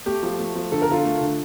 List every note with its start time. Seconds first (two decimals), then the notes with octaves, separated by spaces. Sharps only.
0.06 A3 G4
0.23 F3
0.39 A3
0.55 F3
0.72 D3 A4
0.82 A#4
0.88 D3 F4 A4
1.05 A3
1.21 D3